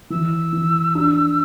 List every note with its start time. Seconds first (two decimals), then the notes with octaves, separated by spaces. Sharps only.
0.10 E3 E6
0.53 E3
0.95 D4